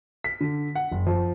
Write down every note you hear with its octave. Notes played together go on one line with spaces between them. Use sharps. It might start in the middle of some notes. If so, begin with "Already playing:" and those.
B6
D3
F#5
F#1
F3